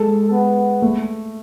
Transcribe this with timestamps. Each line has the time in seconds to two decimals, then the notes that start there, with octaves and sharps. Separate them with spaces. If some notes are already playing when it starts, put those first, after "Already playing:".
Already playing: G#3 A4
0.31 B3
0.82 A3